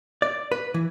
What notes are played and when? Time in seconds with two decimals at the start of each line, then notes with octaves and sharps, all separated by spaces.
0.22 D5
0.52 B4
0.74 E3